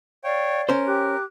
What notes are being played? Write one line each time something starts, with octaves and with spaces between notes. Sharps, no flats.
C#5 D5 F5 G5
C#4 A#4 C5
G4 D6 F#6